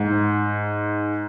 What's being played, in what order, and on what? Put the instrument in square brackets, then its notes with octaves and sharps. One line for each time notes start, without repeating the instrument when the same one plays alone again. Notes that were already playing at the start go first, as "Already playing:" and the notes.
Already playing: [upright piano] G#2